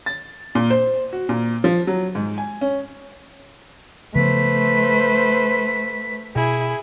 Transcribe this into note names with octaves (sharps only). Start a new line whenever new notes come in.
A6
A#2
C5
F#4
A#2
F3
F#3
G#2
G#5
C#4
C#3 F3 A3 B3 B4 C5 B6
B2 E4 G#4